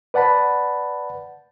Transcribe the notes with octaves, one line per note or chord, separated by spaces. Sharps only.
B4 D5 F#5 A5 B5